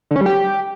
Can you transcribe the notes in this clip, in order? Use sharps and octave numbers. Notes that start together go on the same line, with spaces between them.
D3
C#4
G3
G4